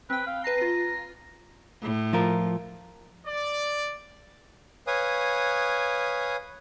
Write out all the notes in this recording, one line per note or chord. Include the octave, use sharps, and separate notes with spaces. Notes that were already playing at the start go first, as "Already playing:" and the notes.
C4 B4 G5
F5
B4 A5 A#5 C7
F4
A2
F3 F4 A#4
D5
B4 C#5 F5 G#5 D#6